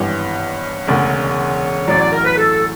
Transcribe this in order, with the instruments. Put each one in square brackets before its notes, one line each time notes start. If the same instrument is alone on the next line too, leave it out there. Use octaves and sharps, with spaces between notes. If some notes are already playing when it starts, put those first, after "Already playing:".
Already playing: [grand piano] G#1 G2 E3 G3 B3 [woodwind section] C#5
[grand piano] E1 D2 C#3
[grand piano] A1 A2 F#3 [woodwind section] D5
[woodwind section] D5
A#4
B4
A4